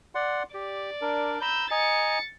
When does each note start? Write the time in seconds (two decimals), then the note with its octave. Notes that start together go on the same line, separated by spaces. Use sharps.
0.15 D5 F#5 C6
0.54 G4 D5
1.01 D4 A#4
1.42 A#5 B5 E6 G6
1.71 D#5 G#5 A#5 A6 C#7